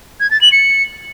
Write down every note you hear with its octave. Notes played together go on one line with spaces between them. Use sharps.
G#6
A6
F#7
C#7